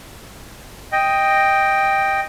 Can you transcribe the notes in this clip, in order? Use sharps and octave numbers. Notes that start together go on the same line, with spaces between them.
D#5 G5